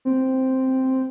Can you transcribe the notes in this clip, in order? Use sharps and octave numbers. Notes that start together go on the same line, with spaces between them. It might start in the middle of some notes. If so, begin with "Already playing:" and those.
C4